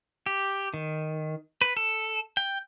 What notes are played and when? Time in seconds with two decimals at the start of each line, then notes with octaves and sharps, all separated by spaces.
0.26 G4
0.74 D#3
1.61 B4
1.77 A4
2.37 G5